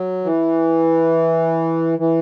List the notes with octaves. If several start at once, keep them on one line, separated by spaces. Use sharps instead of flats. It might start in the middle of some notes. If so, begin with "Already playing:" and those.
Already playing: F#3
E3
E3